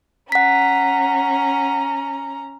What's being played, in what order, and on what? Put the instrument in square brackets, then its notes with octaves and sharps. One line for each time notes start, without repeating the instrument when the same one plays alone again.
[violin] C#4 A#5 [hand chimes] F#5 B6